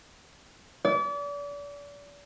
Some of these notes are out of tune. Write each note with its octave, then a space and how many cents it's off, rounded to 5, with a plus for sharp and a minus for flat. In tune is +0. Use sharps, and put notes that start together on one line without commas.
D5 -35